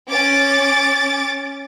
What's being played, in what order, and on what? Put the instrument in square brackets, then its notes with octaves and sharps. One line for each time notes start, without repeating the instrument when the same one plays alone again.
[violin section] C#4 D6 A6